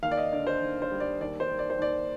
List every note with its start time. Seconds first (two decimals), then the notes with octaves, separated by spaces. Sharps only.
0.03 D#2 F5
0.11 D5
0.17 D#5
0.33 D3 D5
0.47 C5
0.62 D#2
0.82 C5
0.91 G3
1.00 D5
1.21 D#2 D5
1.40 C5
1.49 D#3
1.59 D5
1.70 C5
1.79 D#2 D5